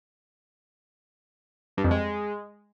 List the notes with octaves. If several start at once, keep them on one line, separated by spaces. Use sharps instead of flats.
G2
F2
G#3